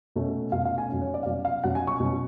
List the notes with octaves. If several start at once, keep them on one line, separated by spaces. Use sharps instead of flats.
B2 A3 C#4
B2 A3 C#4 F5
F5
G#5
B2 F#3 C#4
C#5
D5
F5
B2 F#3 C#4 D5
F5
B2 F#3 C#4 F#5
G#5
C#6
B2 F#3 C#4